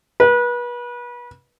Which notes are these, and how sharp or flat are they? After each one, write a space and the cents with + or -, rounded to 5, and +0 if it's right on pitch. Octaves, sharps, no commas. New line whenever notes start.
B4 -30